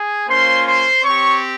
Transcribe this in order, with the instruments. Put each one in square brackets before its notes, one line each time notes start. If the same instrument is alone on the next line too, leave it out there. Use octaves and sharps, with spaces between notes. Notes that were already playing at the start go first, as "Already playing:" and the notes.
Already playing: [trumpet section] G#4 G#5
A#3 C#4 F4 C5 C6
C5 C6
C4 G4 C#5 C#6